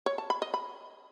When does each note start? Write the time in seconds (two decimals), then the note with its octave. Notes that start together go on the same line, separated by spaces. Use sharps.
0.06 C#5
0.18 A5
0.30 B5
0.42 D#5
0.54 B5